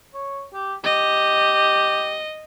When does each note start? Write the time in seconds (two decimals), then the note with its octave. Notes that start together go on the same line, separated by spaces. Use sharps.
0.14 C#5
0.53 G4
0.84 G4 D#5